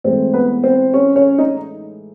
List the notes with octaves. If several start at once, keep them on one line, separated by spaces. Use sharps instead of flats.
A2 E3 G#3 C4 C5
B3 B4
C4 C5
C#4 C#5
C#4 C#5
D#4 D#5